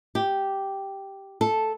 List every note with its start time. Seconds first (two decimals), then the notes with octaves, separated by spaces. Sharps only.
0.15 G4
1.41 A4